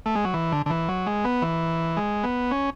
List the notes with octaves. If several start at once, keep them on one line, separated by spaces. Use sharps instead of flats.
A3
G#3
F#3
E3
D3
D3
E3
F#3
G#3
B3
E3
G#3
B3
C#4